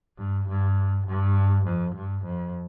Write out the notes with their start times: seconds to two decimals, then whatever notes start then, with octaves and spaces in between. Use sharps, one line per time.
0.18 G2
0.48 G2
1.07 G2
1.66 F2
1.95 G2
2.24 F2